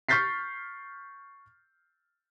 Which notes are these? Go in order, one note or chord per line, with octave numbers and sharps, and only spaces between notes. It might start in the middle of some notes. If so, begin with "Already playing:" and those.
C#6 F6 G6 A6 B6 C7